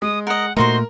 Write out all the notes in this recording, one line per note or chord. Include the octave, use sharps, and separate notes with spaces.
G#3 D#6
A#4 D#5 F#5
A#2 A3 D#4 F#4 A#4 C5 C6